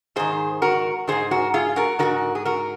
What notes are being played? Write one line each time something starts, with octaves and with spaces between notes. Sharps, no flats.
G#2 D#3 G#4 C5
F#4 A#4
G#2 D#3 G#4 C5
F#4 A#4
F4 G#4
F#4 A#4
G#2 D#3 F#4 A#4
G#4
F#4 A#4